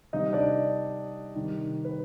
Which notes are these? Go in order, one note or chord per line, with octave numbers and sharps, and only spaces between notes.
C3 G3 D#4 D#5
D4 D5
C3 D#3 G3
B4